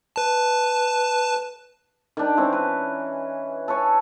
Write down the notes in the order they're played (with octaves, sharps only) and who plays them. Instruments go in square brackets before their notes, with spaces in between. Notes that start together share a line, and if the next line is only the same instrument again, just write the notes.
[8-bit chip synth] B4 A5
[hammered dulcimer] D#3 D4
E3 C4 C#4
B4
A4 B4 C#5 G#5